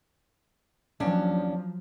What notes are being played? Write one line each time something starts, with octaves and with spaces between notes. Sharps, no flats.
D#2 F3 F#3 C#4 D4